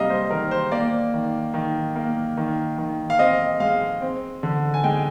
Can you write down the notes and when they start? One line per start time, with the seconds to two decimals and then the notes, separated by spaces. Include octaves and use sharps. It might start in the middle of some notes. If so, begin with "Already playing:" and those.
Already playing: C3 G3 A#3 D#5 F5 A#5
0.10 C5
0.31 D#3 A#4
0.51 C5
0.72 A#3 D5
1.14 D#3
1.54 D#3
1.95 A#3
2.37 D#3
2.78 D#3
3.10 F5
3.19 C4 D#5
3.60 G#3 F5
4.01 C4
4.43 D3
4.74 G#5
4.84 G#3 G5